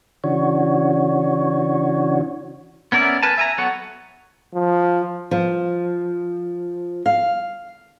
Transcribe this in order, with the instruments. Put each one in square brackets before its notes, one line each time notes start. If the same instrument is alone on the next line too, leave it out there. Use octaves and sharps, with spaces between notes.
[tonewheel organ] C#3 E3 D4 F#4 C#5
[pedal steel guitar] B3 C#4 A#4 D5 E5
A#4 B4 G#5 A5
E5 G#5 A#5
F#3 B3 A4 C#5 F#5
[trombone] F3
[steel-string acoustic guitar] F3
F5